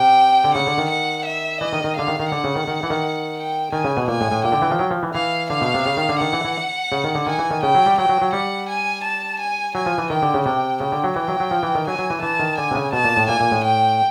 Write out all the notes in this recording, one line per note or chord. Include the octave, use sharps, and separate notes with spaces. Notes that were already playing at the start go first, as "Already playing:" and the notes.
Already playing: C3 G5
D3
C#3 F#5
D3
D#3
F#5
E5
E3 D#5
D#3
D#3
D3 F5
D#3
D#3
D3 F#5
C#3
D#3
D#3
E3
D#3
G5
D#3 G#5
C#3
B2
A#2 G#5
A2
A2
A#2 G5
D3
E3
F3
F#3
F3
E3
E3 F5
D3 F5
B2
C3
C#3
D#3
D3
D#3 F#5
E3
E3
C#3
D#3
D3
D#3 G#5
E3
D#3
C#3 G5
F#3
G3
F#3 G5
F#3
F#3
G3 F#5
G#5
A5
G#5
F#3 G#5
F3
E3
D#3 G5
D3
C#3
C3 G5
C#3 G5
D3
F#3
E3 G5
F#3
F#3
F3
E3
D#3
F#3 G#5
F#3
E3
E3 A5
D#3
D3 G#5
C3
C#3
B2 A5
A#2
A2
A#2 G#5
A#2
A2
G5